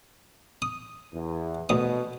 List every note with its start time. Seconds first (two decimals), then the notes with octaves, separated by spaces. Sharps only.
0.62 D#6
1.13 E2
1.69 D2 B2 D#6